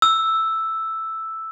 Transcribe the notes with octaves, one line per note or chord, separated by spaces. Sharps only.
E6